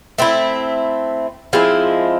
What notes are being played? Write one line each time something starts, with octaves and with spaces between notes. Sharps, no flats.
A3 C4 E4
F3 G#3 C4 E4